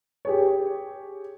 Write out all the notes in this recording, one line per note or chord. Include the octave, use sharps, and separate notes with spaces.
G4 G#4 C#5